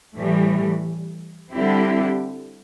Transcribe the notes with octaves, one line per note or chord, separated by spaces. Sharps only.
A2 E3 G3
D3 G3 C4 E4 G4